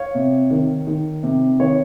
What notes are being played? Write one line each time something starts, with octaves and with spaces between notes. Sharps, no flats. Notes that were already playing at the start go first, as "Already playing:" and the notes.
Already playing: C#5 F5
C3
D#3
D#3
C3
D#3 C#5